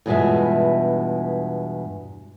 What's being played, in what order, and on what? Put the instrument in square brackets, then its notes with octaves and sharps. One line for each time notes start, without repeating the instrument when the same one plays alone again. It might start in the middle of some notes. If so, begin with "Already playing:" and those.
[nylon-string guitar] E2 G2 B2 G#3 F4 E5